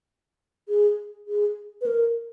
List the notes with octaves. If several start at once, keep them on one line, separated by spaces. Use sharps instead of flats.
G#4
G#4
B4
A#4